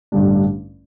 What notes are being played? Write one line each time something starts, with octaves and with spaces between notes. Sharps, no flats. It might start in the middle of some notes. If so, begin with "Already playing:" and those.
A1 G2 D3 G3 D4